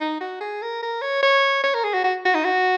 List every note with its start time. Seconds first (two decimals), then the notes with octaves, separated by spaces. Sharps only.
0.01 D#4
0.21 F#4
0.41 G#4
0.62 A#4
0.82 A#4
1.02 C#5
1.22 C#5
1.63 C#5
1.74 A#4
1.84 G#4
1.94 F#4
2.04 F#4
2.25 F#4
2.35 D#4
2.45 F#4